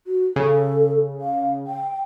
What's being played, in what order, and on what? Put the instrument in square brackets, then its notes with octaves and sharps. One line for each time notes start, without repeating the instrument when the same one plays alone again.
[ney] F#4
[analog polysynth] C#3 [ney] A4
[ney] F5
G5